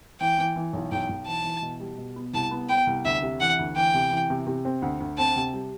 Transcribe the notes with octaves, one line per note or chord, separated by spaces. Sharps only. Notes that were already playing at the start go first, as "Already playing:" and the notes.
E3 G5
E3
E3
B1
B1 G5
B1
E3 A5
E3
B2
G3
B2
B3
C2 A5
B3
B3 G5
C2
D2 E5
C3
E3 F#5
D2
E3 G5
C3
E3
C3
C3
C4
D2
D2
C4 A5
C3
G3